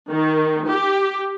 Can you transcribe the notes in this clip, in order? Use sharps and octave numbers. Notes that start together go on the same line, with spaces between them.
D#3
G4